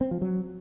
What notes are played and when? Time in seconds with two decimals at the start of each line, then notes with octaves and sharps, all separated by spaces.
0.01 C4
0.11 F3
0.22 F#3